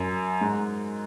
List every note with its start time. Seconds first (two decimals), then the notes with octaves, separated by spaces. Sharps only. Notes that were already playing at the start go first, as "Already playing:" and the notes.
Already playing: F#2
0.41 G#2